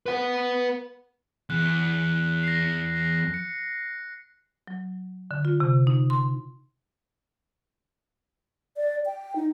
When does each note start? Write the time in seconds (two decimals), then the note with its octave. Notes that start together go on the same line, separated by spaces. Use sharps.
0.06 B4 F#5
1.50 E2 F#6
2.43 A#6 C7
3.34 C#7
4.67 F#3
5.31 D3
5.45 F4
5.60 C3
5.87 D#4
6.10 C6
8.77 D5
9.06 G5
9.36 D#4